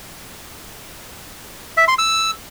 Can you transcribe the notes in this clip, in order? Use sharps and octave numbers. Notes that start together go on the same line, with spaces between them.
E5
C6
E6